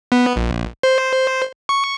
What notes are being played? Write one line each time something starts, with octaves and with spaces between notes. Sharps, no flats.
B3
A#1
C5
C#6